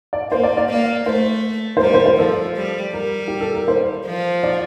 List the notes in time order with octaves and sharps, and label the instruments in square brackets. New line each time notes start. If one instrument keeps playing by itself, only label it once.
[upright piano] D5
[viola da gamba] A#3 [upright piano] C5
[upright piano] D5
D5
[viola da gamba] A#3
[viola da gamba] A3 [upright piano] C5
[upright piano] C5
[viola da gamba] G3 [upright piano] A#4
[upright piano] C5
C5
[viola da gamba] F3 [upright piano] A4
[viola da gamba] G3
[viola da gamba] G3 [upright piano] A#4
[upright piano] G4
A4
A#4
C5
[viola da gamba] F3
[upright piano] D5